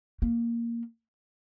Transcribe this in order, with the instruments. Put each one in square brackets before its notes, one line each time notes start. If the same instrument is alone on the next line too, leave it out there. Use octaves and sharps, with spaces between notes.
[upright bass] A#3